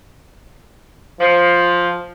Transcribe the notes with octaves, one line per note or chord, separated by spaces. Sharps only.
F3